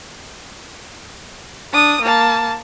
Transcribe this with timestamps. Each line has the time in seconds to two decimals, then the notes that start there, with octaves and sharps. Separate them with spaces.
1.73 D4 D#6
2.02 A#3 A5